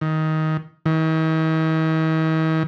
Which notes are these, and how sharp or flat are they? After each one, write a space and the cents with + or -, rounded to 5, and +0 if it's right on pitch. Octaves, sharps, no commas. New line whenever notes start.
D#3 +15
D#3 +45